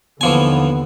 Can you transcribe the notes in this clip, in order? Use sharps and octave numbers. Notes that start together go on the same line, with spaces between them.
D#2 D3 E3 F3 B3 G#5